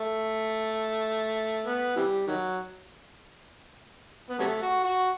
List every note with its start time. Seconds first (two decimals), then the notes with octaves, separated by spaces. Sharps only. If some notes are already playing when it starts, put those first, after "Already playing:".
Already playing: A3
1.66 B3
1.96 C3 E3 G3
2.27 D#3 F#3
4.30 B3
4.39 C3 F#3 A3
4.62 F#4
4.84 F#4